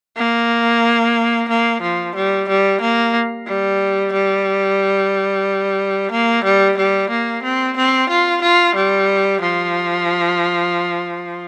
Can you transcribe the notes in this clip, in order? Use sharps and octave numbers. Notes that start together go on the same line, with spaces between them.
A#3
A#3
F3
G3
G3
A#3
G3
G3
A#3
G3
G3
A#3
C4
C4
F4
F4
G3
F3